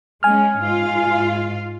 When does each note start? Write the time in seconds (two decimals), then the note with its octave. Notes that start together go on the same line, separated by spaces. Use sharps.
0.23 G#3 C#4 G#5 F6
0.59 G#2 F4 F5